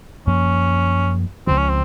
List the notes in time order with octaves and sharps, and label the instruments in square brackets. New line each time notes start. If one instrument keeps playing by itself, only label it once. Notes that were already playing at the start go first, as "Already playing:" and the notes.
[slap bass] F#2 F3 A#3 [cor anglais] C#4
[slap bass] C#2 C#3 F3 [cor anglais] C4
[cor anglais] C#4
C4